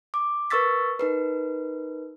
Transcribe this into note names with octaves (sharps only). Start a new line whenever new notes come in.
D6
A#4 B4 C#6 E6 A6 B6
D#4 A#4 B4